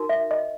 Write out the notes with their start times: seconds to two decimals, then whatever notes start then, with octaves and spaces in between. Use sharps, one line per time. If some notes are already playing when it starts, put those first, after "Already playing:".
Already playing: D#4 F#4 A#4
0.09 E5
0.31 D#5